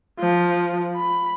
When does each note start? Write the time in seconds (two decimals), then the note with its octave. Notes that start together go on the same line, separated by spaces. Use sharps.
0.19 F3
0.96 B5